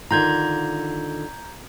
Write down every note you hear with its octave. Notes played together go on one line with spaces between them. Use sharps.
D3 D#3 F4 A#5 G6 G#6